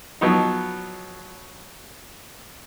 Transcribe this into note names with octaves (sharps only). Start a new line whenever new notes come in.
F3 F#3 B3 D#4